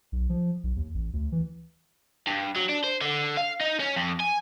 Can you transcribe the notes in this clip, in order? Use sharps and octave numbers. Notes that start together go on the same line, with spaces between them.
B1
F3
B1
D#2
A1
D2
E3
G2
F#3
D4
C5
D3
F5
D#4
C#4
F2
G#5